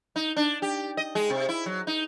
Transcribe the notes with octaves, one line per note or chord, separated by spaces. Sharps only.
D#4
D4
G4
D#5
G#3
C3
E4
F#3
D#4